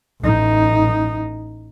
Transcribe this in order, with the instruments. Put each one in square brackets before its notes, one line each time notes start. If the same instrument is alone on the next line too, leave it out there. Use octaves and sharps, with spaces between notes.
[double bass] A1 D#4